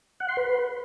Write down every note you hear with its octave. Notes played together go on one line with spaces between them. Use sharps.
F#5
C6
B4